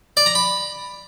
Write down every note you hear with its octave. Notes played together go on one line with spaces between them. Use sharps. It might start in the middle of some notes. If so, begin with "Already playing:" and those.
D5
A#5
B5